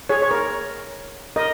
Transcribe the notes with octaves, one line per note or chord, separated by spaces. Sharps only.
G#4 C#5
C#5
A#4
A#4 D#5